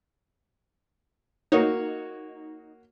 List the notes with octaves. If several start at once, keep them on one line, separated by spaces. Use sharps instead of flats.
A#3 D#4 F#4 C#5